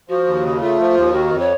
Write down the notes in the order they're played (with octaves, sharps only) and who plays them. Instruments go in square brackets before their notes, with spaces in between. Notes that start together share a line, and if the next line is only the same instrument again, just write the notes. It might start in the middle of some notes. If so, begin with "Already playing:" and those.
[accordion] F3 [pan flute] F#4
[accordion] D#2
C#3
[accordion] A3 [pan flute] F4
[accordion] F3
D#2
[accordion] D#3 [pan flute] F#4
[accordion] F2
[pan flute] C#5